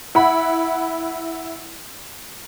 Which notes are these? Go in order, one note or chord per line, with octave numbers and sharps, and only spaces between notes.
E4 F#5 B5